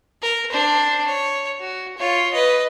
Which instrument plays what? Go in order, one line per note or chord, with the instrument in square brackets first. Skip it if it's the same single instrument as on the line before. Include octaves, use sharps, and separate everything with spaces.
[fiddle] A#4
D4 C5
C#5
F#4
F4 C#5
B4 D#5